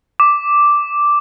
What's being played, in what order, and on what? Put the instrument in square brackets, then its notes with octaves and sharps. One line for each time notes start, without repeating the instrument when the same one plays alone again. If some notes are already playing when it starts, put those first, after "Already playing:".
[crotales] D6